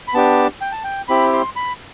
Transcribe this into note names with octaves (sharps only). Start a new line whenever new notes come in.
B5
B3 D4 G4 A5
G5
A5
G5
C4 E4 G4 B5
C6
B5